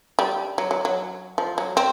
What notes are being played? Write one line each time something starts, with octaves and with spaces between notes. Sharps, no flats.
G3
F#3
F#3
F#3
F3
F#3
C4